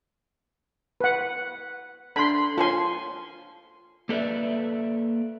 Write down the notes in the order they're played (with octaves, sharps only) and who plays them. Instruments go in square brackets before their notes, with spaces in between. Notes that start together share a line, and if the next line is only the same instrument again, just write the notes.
[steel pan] B4 F#5
[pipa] D3 [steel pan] B5 C6
[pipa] F3 C#5 G#5 [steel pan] F4 C6
[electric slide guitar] A#3 A4 B4 D5 E5